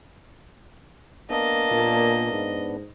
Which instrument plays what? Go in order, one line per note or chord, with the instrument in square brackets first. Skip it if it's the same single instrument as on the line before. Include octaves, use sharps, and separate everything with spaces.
[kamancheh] A#3 A5 [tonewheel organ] B3 D4 [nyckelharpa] D#5
[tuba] A#2
G#2